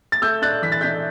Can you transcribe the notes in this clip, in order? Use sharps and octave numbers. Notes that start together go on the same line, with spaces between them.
A6
A3 E6 G6
D4 F#6 A6
E3 B6
A6
D4 G6 B6